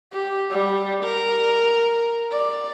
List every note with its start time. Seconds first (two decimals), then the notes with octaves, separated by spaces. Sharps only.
0.13 G4
0.51 G3
1.03 A#4
2.32 D5